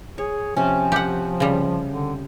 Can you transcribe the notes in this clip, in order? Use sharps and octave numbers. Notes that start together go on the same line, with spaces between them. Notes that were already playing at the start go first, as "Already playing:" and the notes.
G#4 C#5
C3 F3 C#4
G4 F#5
C#3 G3
D3